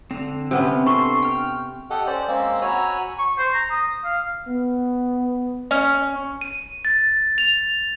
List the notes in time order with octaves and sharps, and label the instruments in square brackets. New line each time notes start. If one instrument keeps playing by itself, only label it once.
[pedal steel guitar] D3 C4
[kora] C3 B3 C#4
[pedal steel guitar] D4 A4 C6 [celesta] C#6
[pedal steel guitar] G5 F6
[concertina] G4 A4 D#5 F#5
C#4 C5 D5
G#3 A#3 C4 C#4 E6
F#4 C#5 G#5 A#5 B5 E6
[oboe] C#6
C5
A#5
D#6
F5
[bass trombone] B3
[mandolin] C#4
[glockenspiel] D#7
A6
F7